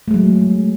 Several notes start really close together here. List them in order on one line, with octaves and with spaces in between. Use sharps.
A3 G#3 F#3